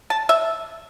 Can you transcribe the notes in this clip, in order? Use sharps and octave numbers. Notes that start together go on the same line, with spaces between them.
A5
E5